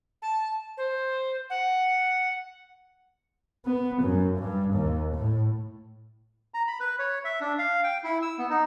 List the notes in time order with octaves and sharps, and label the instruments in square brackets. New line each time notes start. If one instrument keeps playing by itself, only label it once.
[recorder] A5
C5
F#5
[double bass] B3
F#2
G2
D#2
A2
[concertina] A#5
B5
B4
C#5
E5
D4
F5
G5
E4
E6
B3
D#4